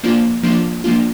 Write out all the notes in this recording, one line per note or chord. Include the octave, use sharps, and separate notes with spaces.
F3 A#3 D4 F4
F3 A#3 D4 F4
F3 A#3 D4 F4